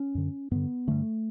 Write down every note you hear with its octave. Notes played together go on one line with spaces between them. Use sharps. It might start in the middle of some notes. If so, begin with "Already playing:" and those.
Already playing: C#4
F#2 D3
G2 D3 B3
G2 D3 A3